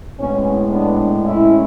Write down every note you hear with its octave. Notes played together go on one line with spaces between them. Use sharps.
A2 G#3 B3 C#4
B3 D4
C#4 E4